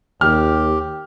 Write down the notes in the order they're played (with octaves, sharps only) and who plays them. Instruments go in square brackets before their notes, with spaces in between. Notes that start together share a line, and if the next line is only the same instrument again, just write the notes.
[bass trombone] D#2 [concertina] G4 [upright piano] F6